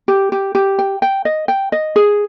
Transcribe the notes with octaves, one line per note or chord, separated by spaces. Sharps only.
G4
G4
G4
G5
G5
D#5
G5
D#5
G#4